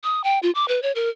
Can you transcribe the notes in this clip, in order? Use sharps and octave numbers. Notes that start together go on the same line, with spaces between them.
D#6
G5
F4
D6
B4
C#5
A#4